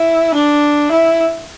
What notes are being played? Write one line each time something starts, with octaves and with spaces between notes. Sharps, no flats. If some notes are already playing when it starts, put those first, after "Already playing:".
Already playing: E4
D4
E4